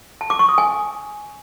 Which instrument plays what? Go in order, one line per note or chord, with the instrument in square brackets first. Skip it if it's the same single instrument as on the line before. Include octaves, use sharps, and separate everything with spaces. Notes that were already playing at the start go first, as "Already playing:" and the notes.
[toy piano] A5
D6
C#6
D#6
G#5